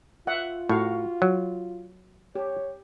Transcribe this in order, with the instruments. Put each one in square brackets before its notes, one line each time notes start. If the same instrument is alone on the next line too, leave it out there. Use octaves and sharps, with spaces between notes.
[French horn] F4 [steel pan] E5 F#5
[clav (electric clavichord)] A2 [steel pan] F#4 F5 C#6
[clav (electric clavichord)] F#3
[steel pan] G4 [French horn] C#5